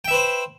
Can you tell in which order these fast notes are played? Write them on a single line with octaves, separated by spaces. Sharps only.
G5 E5 B4 C5